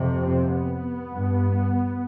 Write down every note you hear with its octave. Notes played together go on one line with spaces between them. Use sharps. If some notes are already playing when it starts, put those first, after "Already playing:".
Already playing: F2 C3
C4
B3
G2